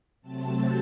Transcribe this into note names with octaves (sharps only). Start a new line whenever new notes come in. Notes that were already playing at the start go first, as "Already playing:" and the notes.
C3 F#3 A3 C4 A5